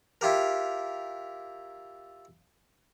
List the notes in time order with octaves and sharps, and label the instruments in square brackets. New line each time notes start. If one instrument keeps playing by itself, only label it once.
[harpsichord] E4 F4 G4 A#4